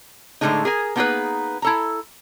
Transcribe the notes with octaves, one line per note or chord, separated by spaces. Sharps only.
A2 D3 F3 G#3 A3 D#4
G#4 A#4 G#5
A#3 B3 D#4 F#4 G#4 B4
E4 A4 A#5